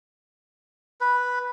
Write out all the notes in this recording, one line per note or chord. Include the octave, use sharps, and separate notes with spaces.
B4